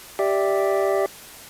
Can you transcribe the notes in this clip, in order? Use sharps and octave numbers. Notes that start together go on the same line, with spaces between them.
G4 D5 E5